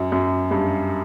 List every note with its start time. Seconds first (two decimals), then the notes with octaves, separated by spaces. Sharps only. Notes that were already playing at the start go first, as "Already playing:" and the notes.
Already playing: F#2
0.12 F#2
0.51 G2